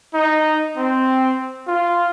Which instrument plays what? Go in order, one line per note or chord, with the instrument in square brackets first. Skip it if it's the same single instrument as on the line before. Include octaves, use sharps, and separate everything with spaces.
[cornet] D#4
C4
F4